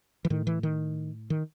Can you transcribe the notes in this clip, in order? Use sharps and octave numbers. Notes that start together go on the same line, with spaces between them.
E3
A2 D#3
E3
D#3
D#3